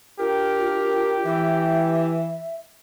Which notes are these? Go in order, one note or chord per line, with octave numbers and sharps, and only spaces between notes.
D4 F4 G4 A#4
E3 E5